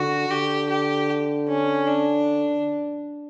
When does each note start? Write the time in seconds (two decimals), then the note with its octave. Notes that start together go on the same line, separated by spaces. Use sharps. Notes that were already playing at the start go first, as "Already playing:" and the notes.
Already playing: D3 F#4
0.29 D3 G4
0.69 G4
1.48 C#4
1.87 D4